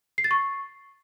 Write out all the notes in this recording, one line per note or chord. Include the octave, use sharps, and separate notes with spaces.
C7
A6
C#6